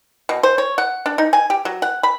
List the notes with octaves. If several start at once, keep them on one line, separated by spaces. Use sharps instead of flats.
B2
C5
C#5
F#5
D4
D#4
G#5
G4
F#3
F#5
B5